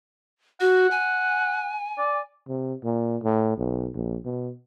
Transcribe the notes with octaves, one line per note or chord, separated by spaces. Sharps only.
F#4 F#5
G#5
D5
C3
A#2
A2
B1
A#1
B2